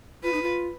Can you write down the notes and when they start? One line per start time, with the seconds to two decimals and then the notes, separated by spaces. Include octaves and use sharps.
0.23 F4 B4
0.33 D#4
0.42 F4